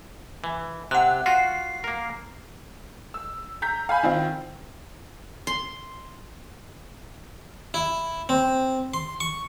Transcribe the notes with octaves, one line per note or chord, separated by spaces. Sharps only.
E3
C3 F#5 F#6
F4 F#4 C7
A#3 A#4
E6
A#5 G6 B6
F5 G#5 B5
D#3 C4 E4 F4
C6
E4
C4
C6
C#6